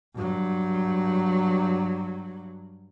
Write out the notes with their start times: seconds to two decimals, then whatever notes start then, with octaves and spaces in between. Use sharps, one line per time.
0.15 G2 F#3